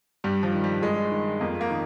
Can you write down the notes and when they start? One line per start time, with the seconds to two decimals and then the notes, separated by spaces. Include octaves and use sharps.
0.24 G2 G3
0.43 F3
0.54 D#3
0.64 G3
0.82 G2 G#3
1.11 D#3
1.40 F2 A#3
1.61 A#3
1.70 D#3